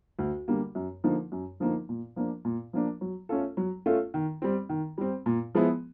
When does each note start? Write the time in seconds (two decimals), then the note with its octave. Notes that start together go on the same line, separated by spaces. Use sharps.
0.19 D2
0.48 D3 G3 A#3
0.75 F#2
1.04 D3 F3 A#3 D#4
1.32 F#2
1.60 D3 F3 A#3 D#4
1.89 A#2
2.16 F3 A#3 D4
2.45 A#2
2.73 F3 A#3 D4
3.01 F#3
3.29 A3 C#4 F4 A4
3.57 F#3
3.86 A3 C#4 F4 A4
4.14 D#3
4.42 G3 C4
4.69 D#3
4.98 G3 C4
5.26 A#2
5.55 F3 G#3 B3 E4